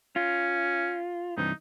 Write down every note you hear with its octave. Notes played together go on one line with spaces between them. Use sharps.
C#4 F4
G2 C3 E3 D#4